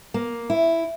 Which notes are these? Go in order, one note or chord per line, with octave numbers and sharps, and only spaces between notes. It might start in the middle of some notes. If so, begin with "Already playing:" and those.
A#3
E4